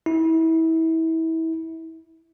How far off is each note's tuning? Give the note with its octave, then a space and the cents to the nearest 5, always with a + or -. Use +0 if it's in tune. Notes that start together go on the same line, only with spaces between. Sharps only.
E4 -30